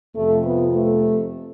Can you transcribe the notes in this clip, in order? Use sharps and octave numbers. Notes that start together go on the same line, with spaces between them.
F2 C3 F3 A3
B3
A3